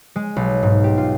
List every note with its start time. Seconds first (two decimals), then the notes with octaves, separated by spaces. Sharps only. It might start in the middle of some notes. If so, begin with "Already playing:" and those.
0.16 G#3
0.36 B1
0.63 G#2
0.84 G4
0.98 F4